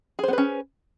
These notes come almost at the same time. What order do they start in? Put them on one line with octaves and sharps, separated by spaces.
G#4 C5 B3 B4 C#4